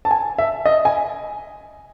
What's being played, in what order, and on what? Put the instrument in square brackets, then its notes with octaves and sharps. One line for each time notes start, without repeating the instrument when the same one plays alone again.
[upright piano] A5
G#5
E5
D#5
G#5